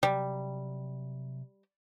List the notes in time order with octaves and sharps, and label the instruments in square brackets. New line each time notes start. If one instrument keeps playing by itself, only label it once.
[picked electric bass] C3 F#3 [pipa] G3